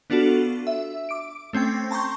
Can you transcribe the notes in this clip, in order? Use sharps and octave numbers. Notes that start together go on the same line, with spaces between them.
B3 D4 F4 F#4 A4
E5
D6 D7
A3 C4 C#4 G5
A5 A#5 C6 C#6 G6